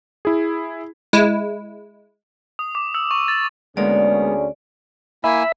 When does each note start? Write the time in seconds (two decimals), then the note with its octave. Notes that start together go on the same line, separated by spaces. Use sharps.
0.25 E4 G#4
1.13 G#3 E4
2.59 D#6
2.75 D6
2.95 E6
3.11 C#6
3.28 A6
3.77 D2 G#3 A#3 B3 C#4 G#4 D5
5.24 A#3 E4 E5 G#5 B5